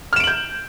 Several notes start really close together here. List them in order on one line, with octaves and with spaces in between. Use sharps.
F6 E7 D7 F#7 G6